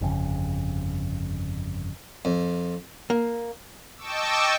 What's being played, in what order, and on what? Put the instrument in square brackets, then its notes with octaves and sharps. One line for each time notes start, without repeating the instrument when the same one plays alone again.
[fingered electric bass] G1 F2 C#3
[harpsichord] F2
[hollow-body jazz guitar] A#3
[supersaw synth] D#5 G5 A5 C#6 D6 E6